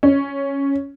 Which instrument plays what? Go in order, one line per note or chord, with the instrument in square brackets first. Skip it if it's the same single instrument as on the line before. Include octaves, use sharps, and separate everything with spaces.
[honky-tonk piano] C#4